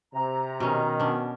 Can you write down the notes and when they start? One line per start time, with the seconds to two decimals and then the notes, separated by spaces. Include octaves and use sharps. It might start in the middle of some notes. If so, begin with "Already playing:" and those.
0.13 C3 A#5
0.60 B2 D#3 C#4
0.99 B2 C#4 D4